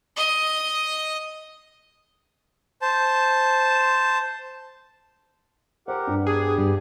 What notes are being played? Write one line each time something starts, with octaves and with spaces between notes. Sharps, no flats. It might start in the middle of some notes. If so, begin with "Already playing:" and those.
D#5
C5 A5
G4 A#4 C5 F#5
G2
B3 D4 G4 G#4
G2